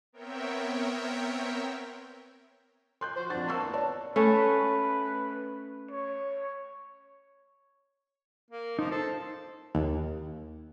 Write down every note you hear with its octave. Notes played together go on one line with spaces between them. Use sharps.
B3 C4 A#4 C#5 E5 G5
C6 F#6 G6
F3 F#4 C5
F2 D4 F#4 A6
A#3 A5 C#6 E6
A2 B3
C#5 D5 A5
A3 C#4 B4
C#5
A#3
F3 D#4
A4 C5
D#2